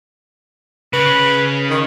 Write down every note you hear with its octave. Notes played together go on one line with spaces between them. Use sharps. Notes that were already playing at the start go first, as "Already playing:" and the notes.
C#3 B4
D#3